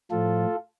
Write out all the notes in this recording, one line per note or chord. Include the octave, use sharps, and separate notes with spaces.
A2 F3 F4 A4